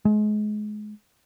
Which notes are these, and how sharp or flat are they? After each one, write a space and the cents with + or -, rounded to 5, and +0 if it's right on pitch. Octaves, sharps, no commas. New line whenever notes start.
G#3 +30